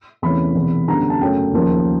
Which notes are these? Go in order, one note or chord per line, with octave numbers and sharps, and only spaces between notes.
E2 C3 E3 A3 C#4 B5
E1 E2 C3 E3
F#2 D3 G3 B3 A#5
A5
F#2 C#3 F#3 A3 C#4 G5
D#2 C#3 F3 A#3